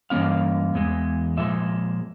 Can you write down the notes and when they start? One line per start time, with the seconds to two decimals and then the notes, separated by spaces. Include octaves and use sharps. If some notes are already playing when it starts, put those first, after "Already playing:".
0.10 G2 E3 A#3 C#4 F5
0.74 E2 E3 G#3
1.37 A#2 F3 G#3 E5